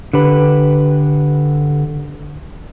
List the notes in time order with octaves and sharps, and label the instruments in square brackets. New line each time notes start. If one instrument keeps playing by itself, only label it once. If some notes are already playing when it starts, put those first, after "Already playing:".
[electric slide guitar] D3 G4 B4